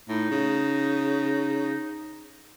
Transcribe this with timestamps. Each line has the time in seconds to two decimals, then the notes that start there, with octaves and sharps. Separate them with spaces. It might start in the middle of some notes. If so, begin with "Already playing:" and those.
0.08 A2 D#4
0.31 C#3